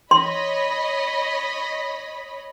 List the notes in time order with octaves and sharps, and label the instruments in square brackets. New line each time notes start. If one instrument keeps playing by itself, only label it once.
[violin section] C#5 D#5 B5 [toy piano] C6